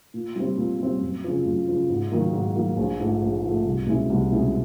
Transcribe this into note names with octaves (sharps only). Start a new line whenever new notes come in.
A#2
G3 C4
A#2
G3 C4
F#2
C#3 F3
F#2
C#3 F3
G#2
D#3 F#3 A#3
G#2
D#3 F#3 A#3
A#1
G#2 F3 A3
A#1
G#2 F3 A3
C2
B2 G#3 C#4 E4
C2
B2 G#3 C#4 E4